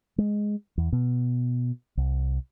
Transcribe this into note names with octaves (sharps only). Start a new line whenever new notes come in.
G#3
E2
B2
C2